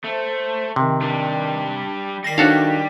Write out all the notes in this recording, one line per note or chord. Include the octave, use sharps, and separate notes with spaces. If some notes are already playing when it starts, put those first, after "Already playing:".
A3 C5
C3 D#3
D#3 G3 D4
D#3 G3 A#6 C7
D4 D#4 F#4 A4 F5